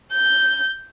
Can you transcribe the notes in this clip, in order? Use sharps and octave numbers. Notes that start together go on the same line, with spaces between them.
G6